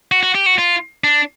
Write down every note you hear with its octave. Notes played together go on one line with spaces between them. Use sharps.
F#4
F#4
G4
F#4
F4
D4